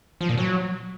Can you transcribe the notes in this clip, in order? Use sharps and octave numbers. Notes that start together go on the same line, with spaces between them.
F3
A#2
F#3